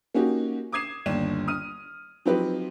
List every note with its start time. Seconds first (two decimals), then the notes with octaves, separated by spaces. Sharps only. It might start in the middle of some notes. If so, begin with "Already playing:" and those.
0.15 A#3 C#4 D#4 F#4 G4
0.72 D6 D#6 G#6 C7 E7
1.06 G1 D#2 D4 E7
1.48 D#6 F6 D#7
2.25 F3 F#3 C4 D#4 G4 B4